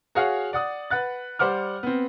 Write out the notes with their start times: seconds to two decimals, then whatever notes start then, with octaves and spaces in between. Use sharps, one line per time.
0.15 F#4 G#4 C#5 F5 F#5
0.53 D5 F#5 D#6
0.90 B4 F#5 F#6 A6
1.39 G3 C5 F#5 D6 F6
1.83 B3 C4